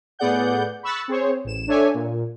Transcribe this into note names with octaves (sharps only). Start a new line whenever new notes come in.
A2 B3 G#4 D5 F#5 G6
B5 C#6 E6 F#6 A6
C4 G#4 C5 C#5
A1 E7
D4 A4 C#5 D5 E5 G#5
A#2